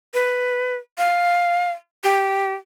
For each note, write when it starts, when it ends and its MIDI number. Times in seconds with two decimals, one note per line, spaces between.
0.14 0.76 71
0.98 1.70 77
2.04 2.54 67